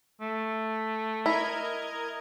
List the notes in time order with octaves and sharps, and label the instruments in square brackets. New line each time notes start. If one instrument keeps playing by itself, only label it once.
[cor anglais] A3
[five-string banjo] E4 [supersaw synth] A#4 D#5 G#6